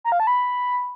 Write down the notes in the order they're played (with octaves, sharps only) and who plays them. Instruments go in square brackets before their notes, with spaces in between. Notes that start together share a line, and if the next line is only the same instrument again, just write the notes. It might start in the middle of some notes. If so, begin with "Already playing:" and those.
[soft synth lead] A#5
F5
A5
B5